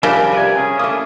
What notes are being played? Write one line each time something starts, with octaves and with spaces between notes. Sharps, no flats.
C#3 F3 G3 D4 A#4 E5
C3 B4 D5 G#5
C#4 G#4
A3 A#3 E4 D#6